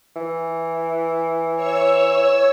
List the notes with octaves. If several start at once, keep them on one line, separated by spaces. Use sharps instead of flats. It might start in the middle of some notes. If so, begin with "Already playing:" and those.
E3
C#5 E6